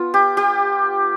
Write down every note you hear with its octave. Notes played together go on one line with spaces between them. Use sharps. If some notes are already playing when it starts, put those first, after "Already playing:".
Already playing: B3 F4
G4
G4